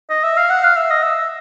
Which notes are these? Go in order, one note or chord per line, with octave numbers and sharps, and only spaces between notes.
D#5
E5
F5
F#5
F5
E5
D#5
E5